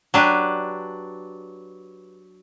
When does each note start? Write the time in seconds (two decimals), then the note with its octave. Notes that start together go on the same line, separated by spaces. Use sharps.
0.14 F#3 D4 G4 B4